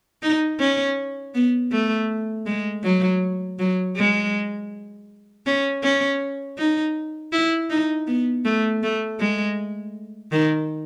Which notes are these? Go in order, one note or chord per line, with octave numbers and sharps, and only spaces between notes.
D#4
C#4
B3
A3
G#3
F#3
F#3
G#3
C#4
C#4
D#4
E4
D#4
B3
A3
A3
G#3
D#3